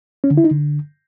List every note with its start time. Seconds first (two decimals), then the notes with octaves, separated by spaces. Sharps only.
0.24 C#4
0.31 D3
0.37 E4
0.44 D#4
0.51 D3